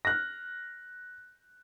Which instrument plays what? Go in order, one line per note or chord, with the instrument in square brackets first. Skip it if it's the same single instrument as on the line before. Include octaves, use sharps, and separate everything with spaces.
[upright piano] F6 F#6 A#6